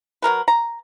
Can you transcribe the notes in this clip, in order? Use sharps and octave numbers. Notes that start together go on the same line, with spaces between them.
F#3 G#3 A#4 B4
A#5